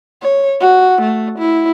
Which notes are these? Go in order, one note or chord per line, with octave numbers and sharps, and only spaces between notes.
C#5
F#4
A3
E4